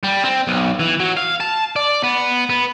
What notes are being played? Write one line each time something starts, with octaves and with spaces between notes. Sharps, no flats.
G3
C4
B1
E3
F#3
F5
A5
D5
B3
B3